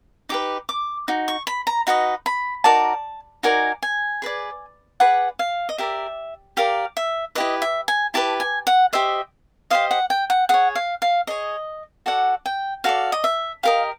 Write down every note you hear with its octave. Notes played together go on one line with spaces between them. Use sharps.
D#4 G4 B4 D6
D6
D#4 F#4
C#6
B5
A#5
D#4 F#4 B4 D#5
B5
D#4 F#4 A#4 D5 A5
D#4 F#4 A#4 D5 G#5
G#5
G#4 B4 D5
G#4 B4 D5 F#5
F5
D#5
G4 A#4 D5 E5
G4 A#4 D5 F5
E5
E4 G4 B4 D#5
E5
G#5
E4 G4 B4 A5
G#5
F#5
G4 C5 D#5 E5
G4 C5 D#5 F5
F#5
G5
F#5
G#4 C#5 F#5
F5
F5
G#4 C#5 D#5
F#4 A4 D5 F#5
G5
F#4 A4 D5 F5
D#5
E5
G4 A#4 D#5 F5